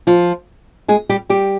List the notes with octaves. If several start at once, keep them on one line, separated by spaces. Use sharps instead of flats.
F3 F4
G#3 G#4
G3 G4
G3 G4